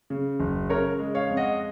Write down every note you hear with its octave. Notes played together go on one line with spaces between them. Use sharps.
C#3
F#1
C#3 A#4 C#5
G#3
C#5 F5
F2
D#5 F#5